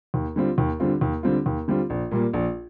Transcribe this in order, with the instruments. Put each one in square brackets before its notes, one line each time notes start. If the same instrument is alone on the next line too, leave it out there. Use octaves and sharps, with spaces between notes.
[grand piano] D#2
D3 G3 C4 F4
D#2
D3 G3 C4 F4
D#2
D3 G3 C4 F4
D#2
D3 G3 C4 F4
A#1
A#2 G3 A#3
A#1